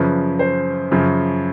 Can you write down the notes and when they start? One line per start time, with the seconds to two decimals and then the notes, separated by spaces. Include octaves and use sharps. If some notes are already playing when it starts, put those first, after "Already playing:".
Already playing: F#2 C#3 F3 B4
0.39 C5
0.92 F#2 C#3 F3